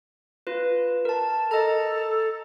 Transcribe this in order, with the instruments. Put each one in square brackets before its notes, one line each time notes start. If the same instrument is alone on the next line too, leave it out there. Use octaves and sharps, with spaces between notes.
[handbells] F4 B4
A#4 A5
[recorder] A4 [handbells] D#5 A#5